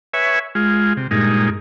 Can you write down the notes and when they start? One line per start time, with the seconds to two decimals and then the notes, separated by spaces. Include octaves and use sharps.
0.14 B4 C#5 E5 G#5
0.55 G#3 F4
0.97 C3
1.11 G2 A#2 G#3 D#4